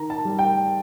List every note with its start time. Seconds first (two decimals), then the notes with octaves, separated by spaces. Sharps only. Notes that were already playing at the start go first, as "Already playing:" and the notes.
Already playing: D#3 A#5
0.10 A5
0.25 G3
0.39 G5